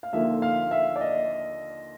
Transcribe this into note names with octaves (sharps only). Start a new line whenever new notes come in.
F5
D#2 D3 F3 A#3 E5
F5
E5
D5
D#5